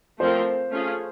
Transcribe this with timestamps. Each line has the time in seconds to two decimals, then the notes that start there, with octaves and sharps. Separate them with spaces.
0.20 F3 A3 C4 F4 A#4 C5
0.71 A3 C#4 F4 G#4